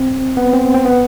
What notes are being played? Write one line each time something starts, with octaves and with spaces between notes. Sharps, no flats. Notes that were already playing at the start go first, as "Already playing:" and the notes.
Already playing: C4
B3
C4
C4
B3